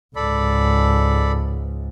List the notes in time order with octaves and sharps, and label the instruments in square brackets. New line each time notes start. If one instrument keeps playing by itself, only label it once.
[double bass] C#2 G#2 [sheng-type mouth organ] A4 D5 B5